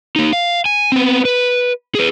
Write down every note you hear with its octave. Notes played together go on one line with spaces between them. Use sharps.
A#3 D#4
F5
G#5
B3 C4
B4
G#4 B4